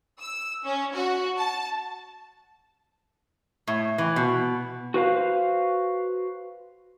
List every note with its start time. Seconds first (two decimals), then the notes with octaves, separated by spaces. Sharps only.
0.20 E6
0.64 C#4
0.94 F#4
1.37 A5
3.67 A2
3.98 E3
4.16 B2
4.94 F#4 B4 C5 F5